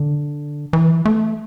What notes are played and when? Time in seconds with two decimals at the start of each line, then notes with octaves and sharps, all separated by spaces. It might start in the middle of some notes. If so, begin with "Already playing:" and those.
Already playing: D3
0.73 E3
1.05 A3